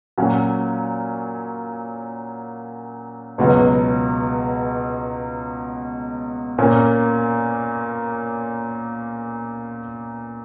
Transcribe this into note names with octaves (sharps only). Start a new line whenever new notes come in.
A#2 F#3 C#4
C#2 B2 F#3
A#2 A#3 C#4